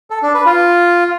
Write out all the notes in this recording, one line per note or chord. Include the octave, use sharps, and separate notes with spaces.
A4
D4
B4
F4